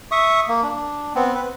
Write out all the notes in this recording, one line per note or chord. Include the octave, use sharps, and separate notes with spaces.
E5 C#6 D#6
A#3
D4
B3 C4
B4